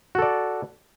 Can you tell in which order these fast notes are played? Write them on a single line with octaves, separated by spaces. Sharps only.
F#4 A4 D5